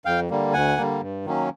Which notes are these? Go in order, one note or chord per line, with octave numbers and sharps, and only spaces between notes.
F2 F5 G5
D3 G3 A#3
D2 F#5 G#5
D3 G3 A#3
G2
D#3 F#3 A#3 C#4